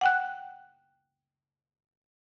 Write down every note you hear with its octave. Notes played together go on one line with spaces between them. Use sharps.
F#5 G5 F#6